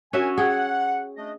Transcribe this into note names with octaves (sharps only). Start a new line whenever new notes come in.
C#4 D4 F#4 A#4 E5 G#5
G#4 F#5 G5
A3 D4 D#5